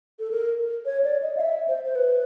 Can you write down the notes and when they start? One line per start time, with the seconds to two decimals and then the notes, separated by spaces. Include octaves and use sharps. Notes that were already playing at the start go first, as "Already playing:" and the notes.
0.19 A4
0.31 A#4
0.85 C#5
1.04 D5
1.22 D#5
1.37 F5
1.41 E5
1.68 C5
1.84 C5
1.95 B4